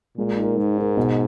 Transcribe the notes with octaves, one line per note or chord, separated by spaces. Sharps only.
A#2 G#3
D#4 A#4
G#2 G#3
D#4 A#4
B2